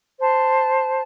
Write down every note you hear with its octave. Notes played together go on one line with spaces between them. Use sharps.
C5 A5